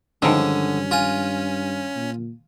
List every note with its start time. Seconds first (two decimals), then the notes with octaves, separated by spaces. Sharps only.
0.22 G2 D3 D#3 F3 G#3 C#4
0.91 F4 G#5
1.96 A#2